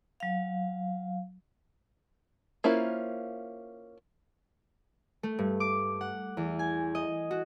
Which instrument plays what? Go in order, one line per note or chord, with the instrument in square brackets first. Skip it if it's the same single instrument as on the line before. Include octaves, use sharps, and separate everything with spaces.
[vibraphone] F#3 F5
[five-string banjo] A#3 C#4 E4 F4 C5
[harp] A3
G2
D6
F#5
E2
G#5
D#5
F#4